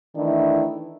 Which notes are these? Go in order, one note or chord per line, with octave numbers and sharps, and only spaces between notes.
D#3 E3 A3 D4 E4